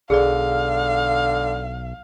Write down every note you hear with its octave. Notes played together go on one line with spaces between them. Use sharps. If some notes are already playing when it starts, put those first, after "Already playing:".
B1 D3 G#4 D5 F5